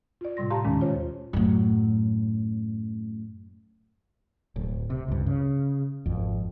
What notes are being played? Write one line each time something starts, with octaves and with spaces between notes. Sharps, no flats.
F4 D5
A2 C3 G3 C6 A#6
G4 F5 A5 A#5 C6
D#2 A#2 D#3 G#3 C#4
F4 C5 C#5
F#2 A2
D1
C3
C#2 G2
C#3
G#1 F2